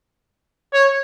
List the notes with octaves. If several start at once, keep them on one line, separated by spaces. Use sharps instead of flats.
C#5